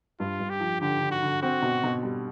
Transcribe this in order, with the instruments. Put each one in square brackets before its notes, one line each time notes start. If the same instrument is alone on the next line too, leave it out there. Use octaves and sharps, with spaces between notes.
[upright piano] G2 [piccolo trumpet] F4
[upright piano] G2
[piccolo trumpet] G4
[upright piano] F3
[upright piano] D3 [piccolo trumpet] G4
[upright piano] D3
[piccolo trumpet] F#4
[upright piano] D3
[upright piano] C4 [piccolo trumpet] F#4
[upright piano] B2
B2
G3